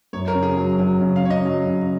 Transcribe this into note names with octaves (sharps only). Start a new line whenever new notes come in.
F#2 C#5
A#4
C#3
G#4
F#3
F#3
C#3
F5
C#3 C#5
D#5
F#3
C#3